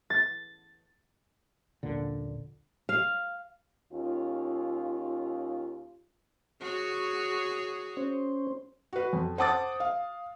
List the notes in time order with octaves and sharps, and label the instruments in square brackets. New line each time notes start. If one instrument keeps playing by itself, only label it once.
[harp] A6
[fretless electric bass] D#1 A#1 A#2 D3
[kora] F5
[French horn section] D#2 C#4 F4
[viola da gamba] F#4 G#4 C#5
[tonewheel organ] C#4 C5
[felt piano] F#4 B4
F2
C5 F#5 A5 D6 D#6 A6
F5